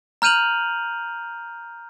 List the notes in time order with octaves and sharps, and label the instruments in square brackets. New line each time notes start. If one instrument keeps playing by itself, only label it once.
[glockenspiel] A#5 F6 G6 D#7 F7 F#7